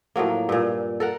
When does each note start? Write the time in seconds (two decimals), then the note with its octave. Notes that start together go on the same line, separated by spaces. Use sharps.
0.16 A2 F3 F#3 A#3
0.49 G2 A#2
1.00 A4 A#4 F#5